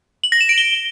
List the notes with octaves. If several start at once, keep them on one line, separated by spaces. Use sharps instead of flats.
F#7
A#6
E7
D7
G7